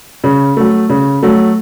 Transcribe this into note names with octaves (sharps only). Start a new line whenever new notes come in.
C#3
F#3 A3
C#3
F#3 A3